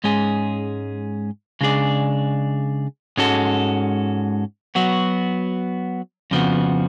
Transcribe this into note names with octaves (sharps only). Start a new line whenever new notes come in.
G#2 G#3 C#4 G#4
C#3 G#3 D4 G#4 D5
G#2 G#3 C#4 F#4 A4
F#3 B3 F#4
F2 C#3 F3 B3 F#4